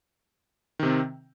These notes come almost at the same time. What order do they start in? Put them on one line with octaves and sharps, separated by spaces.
D#3 C3 C4